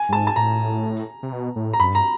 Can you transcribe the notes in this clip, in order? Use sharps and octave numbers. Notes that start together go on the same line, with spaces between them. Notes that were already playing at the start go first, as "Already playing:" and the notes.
Already playing: G#5
G2
G#2 A5
A5
A2 A#5
C3
B2
A2
A#5
F#2 B5
G2 A#5